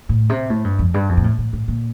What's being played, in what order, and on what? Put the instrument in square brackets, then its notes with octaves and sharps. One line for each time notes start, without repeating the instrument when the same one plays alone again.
[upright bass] A2
C3
A2
G2
F2
G2
F2
A#2
A2
A2
A2
A#2